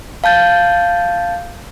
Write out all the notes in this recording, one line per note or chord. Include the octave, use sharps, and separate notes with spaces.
F5 A5 G6 A6